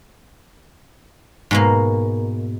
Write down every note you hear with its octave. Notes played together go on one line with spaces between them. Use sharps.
G#2 B2 A#3